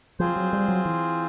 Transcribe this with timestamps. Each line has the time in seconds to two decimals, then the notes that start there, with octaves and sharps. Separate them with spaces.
0.20 F3 C4 F4 G#4 C5
0.36 F#3
0.53 G3
0.68 F#3
0.86 E3